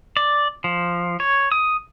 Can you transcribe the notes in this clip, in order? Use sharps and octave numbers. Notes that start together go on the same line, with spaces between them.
D5
F3
C#5
D#6